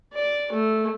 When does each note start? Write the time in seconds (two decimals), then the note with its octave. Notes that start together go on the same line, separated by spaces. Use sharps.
0.13 D5
0.52 A3